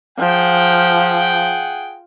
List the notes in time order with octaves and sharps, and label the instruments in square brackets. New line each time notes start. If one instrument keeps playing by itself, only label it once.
[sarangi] F3 [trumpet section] G#4 F#5 G5